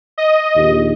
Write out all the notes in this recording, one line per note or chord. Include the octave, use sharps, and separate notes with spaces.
D#5
A#1 D#2